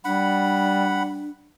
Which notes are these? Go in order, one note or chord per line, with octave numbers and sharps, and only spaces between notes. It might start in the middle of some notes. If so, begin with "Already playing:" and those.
G3 D4 F#5 B5